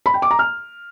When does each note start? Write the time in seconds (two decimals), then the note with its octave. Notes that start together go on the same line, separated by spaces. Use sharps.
0.06 B5
0.14 G5
0.22 D6
0.31 A#5
0.39 F6